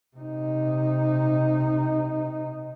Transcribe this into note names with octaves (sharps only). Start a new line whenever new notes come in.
C3 D#4